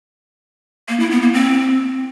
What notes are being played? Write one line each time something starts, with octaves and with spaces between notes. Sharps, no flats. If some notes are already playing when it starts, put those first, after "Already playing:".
A#3
E4
B3
A#3
C4